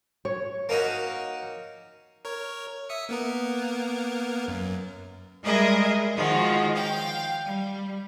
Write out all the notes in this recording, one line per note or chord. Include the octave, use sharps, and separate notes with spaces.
C#5
A#3 C#4 D#4 F#4
A#4 C#5
E5 D#6 C#7
A#3 B3 A#4
F#2
G3 G#3 G#4 A#4 D#5 E5
D#3 F3 G#3 F4 F#4
F5 G5
G3